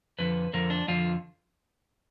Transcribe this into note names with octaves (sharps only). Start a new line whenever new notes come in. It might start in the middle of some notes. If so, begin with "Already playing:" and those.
F2 D3 F3 B4
F2 D3 F3 A#4
D4
F2 D3 F3 F4